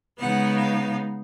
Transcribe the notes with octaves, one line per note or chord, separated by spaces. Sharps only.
C#3 G#3 B3 D#4 F#5
F5